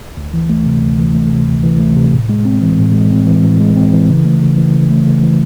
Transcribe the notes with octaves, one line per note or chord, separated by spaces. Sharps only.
D2
E3
A3
C3
D2
E3
A3
C3
D2
E3
A3
C3
A2
G#3
C4
E3
A2
G#3
C4
E3
A2
G#3
C4
E3
C#3
A3
C#3
E3
C#3
A3
C#3
E3